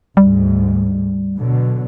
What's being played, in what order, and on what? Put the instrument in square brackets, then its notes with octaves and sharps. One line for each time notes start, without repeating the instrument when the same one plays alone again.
[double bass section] D2 G#2 [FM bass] G3
[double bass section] B2 D3 F#3